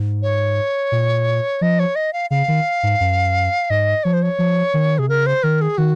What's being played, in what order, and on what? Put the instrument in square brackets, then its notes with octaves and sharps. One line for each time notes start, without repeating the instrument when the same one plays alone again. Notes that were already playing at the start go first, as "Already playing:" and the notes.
Already playing: [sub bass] G#2
[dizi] C#5
[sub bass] A#2
[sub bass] F3 [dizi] D#5
[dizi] C#5
D#5
F5
[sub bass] C#3 [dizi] F5
[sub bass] D#3
G#2
F#2
[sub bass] G#2 [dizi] D#5
[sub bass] F3 [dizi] C#5
[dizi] C5
C#5
[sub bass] F3
D#3
[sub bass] C3 [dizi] G#4
[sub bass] C#3 [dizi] A#4
[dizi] C5
[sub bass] D#3 [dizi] A#4
[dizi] G#4
[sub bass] D#3 [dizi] F#4